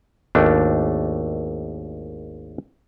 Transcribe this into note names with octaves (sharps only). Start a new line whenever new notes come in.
G#1 D#2 A3 D4